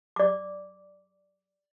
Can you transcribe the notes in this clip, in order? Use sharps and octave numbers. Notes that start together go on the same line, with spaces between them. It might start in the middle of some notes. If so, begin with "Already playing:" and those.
D5 D6